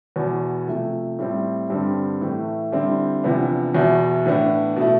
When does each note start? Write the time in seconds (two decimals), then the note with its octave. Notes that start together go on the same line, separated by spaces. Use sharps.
0.16 E2 B2 B3
0.67 C3 F3 A3
1.18 A2 G3 C4
1.70 G2 D3 G3 C4
2.21 A2 E3 A3
2.72 D3 G3 C4 E4
3.23 E2 C3 F3 B3 D4
3.74 E2 B2 B3 E4
4.26 A2 E3 B3 D4
4.76 B2 A3 E4